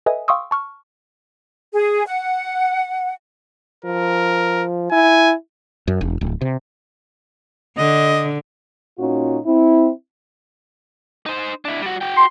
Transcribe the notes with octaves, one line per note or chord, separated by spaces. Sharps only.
A4 B4 D#5 E5 G#5 D#6
F5 G5 C6 C#6 D#6 E6
A5 C#6 F6
G#4
F#5
F3 A#4
E4 G#5
F#2
E1
D1
C3
D3 D#5
A#2 C#4 D#4 F4 F#4
C4 E4
D#4 C5
D4 E4
G3 F#4
F#4 G5
C6